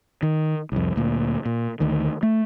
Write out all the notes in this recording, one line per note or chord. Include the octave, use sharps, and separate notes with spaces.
D#3
C2 F2
D2 A#2
A#2
D2 D#3
A3